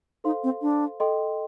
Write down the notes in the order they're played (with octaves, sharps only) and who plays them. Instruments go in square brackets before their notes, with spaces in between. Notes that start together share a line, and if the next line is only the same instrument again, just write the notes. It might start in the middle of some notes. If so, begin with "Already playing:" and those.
[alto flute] D#4 [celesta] A4 C5 F5 C6
[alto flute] C4
D4
[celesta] A4 D#5 G5 C6